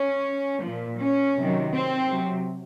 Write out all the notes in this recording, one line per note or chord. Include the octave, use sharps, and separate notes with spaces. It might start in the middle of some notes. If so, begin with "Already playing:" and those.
Already playing: C#4
A#2 F3
C#4
C3 D#3 F#3
C4
C3 F#3